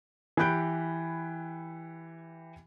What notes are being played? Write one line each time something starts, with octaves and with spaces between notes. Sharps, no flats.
E3 G4 B5 F#6 G6 D7